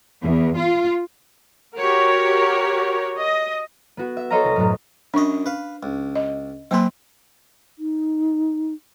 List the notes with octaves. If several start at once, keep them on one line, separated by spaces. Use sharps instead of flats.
E2
F4
F#4 G4 A#4 C#5
D#5
B3 F#4
E5
A4 C5 C#5 D#5 F5 A#5
C2 A#6
F#2 A2
F#2 D4 D#5 C#6
B4 F5
C#2
D#5
F#3 A#3 C4 B4 C6
D#4